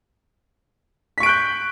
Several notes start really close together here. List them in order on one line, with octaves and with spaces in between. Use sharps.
B6 C#6 D7 F#6 G6